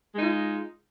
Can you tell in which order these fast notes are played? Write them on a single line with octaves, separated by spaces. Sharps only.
G#3 D#4 F4